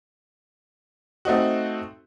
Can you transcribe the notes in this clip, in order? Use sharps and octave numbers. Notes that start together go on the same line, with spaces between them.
A3 C4 D#4 F#4